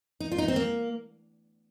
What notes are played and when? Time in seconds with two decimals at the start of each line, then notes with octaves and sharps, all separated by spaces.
0.20 D#4
0.32 F4
0.38 D#4
0.48 C4
0.56 A#3